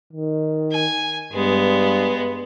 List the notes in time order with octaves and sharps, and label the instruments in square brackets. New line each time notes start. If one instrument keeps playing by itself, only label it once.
[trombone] D#3
[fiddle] G#5
[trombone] G2 [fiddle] G#3 B3